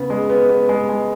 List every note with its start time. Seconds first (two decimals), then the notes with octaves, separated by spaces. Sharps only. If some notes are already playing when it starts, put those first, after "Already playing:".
Already playing: C#3 B3
0.10 G#3
0.29 B3
0.49 B3
0.69 G#3
0.89 G#3